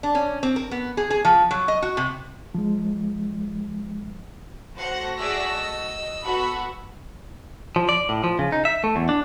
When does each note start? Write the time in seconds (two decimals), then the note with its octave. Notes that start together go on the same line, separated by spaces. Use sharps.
0.03 D4
0.15 C#4
0.43 C4
0.56 A#4
0.71 B3
0.97 G#4
1.10 G#4
1.25 F3
1.51 F#3
1.68 D#5
1.82 F#4
1.97 C3
2.54 F3 G#3
4.77 A3 F#4 C5 F#5 A#6
5.19 G#4 D5 E5 E6
5.52 D#5
6.24 B3 F#4 A4 F#5 B5
7.76 F3
7.89 D5
8.09 A2
8.24 F3
8.39 C#3
8.52 D#4
8.65 E5
8.84 A3
8.96 E2
9.09 D4